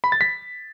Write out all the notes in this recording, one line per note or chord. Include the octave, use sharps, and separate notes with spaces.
B5
A6
B6